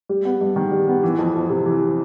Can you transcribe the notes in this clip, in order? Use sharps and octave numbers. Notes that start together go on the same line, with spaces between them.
G3
B3
G2
D#3
G3
B3
E3
F2
F2
C3
E3